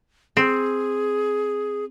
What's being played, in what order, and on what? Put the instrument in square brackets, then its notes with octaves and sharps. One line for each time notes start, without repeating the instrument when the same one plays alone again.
[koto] C4 [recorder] G#4